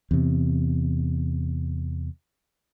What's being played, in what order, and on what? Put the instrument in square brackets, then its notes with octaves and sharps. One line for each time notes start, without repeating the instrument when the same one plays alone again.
[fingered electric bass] E2 C3